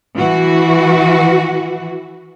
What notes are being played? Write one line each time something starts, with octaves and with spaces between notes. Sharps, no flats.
E3 F#4